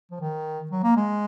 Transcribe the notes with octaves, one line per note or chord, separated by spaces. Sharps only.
F3
D#3
F#3
A#3
G#3